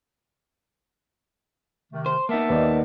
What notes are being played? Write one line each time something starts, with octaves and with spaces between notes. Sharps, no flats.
C3 D#3 A3
C5
A#3 B3 D#4 E5 A5
D#2 B4 D5 D#5